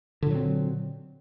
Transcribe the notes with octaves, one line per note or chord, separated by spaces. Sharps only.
A#2 D3 F#3 C4